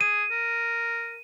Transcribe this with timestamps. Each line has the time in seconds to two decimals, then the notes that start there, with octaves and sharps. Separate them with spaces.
0.01 G#4 D#7
0.31 A#4